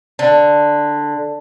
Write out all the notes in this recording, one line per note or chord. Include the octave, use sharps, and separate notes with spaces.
D3